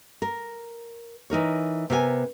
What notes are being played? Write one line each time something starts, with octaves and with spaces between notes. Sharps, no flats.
A#4
E3 D#4 A#4 C#5
C3 B3 A#4 C5 G#5